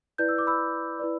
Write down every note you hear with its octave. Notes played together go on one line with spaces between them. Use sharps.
E4 B4 D5 G6
E6
D6
B5 E6
E4 B4 D5